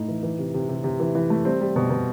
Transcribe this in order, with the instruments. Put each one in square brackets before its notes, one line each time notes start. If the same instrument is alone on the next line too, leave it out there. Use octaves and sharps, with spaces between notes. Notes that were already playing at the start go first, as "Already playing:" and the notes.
Already playing: [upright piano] A2 D#4
E3
E3
C3
C3
C3
C3
E3
E3
A3
G3 C4
G3
B2
B2